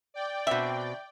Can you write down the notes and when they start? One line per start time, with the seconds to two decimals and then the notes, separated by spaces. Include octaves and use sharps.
0.14 D5 G5
0.47 B2 C4 E5